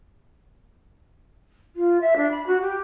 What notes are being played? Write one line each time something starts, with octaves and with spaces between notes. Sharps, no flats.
F4
E5
D4
B5
F#4
G4